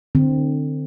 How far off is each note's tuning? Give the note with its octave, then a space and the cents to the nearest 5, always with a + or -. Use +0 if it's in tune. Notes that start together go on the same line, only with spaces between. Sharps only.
D3 +30 C4 +0